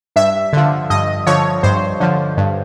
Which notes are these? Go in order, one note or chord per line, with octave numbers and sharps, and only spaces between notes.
G2 E5
D3 F3
G2 D#5
D3 F3 C#5
G2 C5
D3 F3
G2